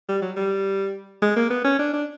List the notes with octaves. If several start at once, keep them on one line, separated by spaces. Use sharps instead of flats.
G3
F#3
G3
G#3
A#3
B3
C#4
D4
D4